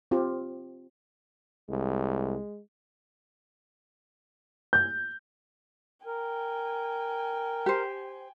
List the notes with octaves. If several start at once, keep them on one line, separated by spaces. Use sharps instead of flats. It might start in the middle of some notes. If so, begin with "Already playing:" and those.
C4 F4 G4
C2 G#3
G6
A#4 G5 G#5
G4 C5